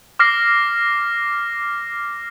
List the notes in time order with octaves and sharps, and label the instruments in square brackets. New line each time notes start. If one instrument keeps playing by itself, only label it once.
[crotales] D6 F6 A#6 C7